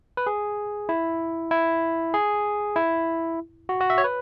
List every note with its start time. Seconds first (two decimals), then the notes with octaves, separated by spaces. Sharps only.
0.17 B4
0.27 G#4
0.89 E4
1.51 E4
2.14 G#4
2.76 E4
3.69 F#4
3.81 F#4
3.90 E5
3.98 C#5
4.04 B4